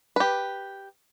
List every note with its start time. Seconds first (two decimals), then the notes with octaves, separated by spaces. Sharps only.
0.16 G4 B4